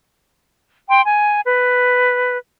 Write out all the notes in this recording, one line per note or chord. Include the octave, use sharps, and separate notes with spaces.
G5 C6
G#5
B4